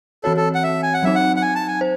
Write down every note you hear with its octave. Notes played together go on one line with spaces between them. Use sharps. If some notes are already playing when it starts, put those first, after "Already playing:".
E3 C4 F#4 A4 C#5
A4
F#5
E5
G#5
F#5
F#3 C4 D#4 E5
F#5
F#5
G#5
A5
G#5
C5